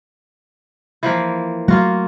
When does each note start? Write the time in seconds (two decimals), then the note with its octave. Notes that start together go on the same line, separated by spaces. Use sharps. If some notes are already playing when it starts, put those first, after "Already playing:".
1.03 E3 F3 A#3
1.68 F#3 A3 A#3 F4 F#4